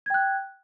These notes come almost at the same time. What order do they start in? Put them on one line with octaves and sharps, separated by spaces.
G#6 G5 F#6